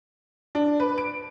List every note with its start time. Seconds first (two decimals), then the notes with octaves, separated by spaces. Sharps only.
0.55 D4
0.80 B4
0.98 D7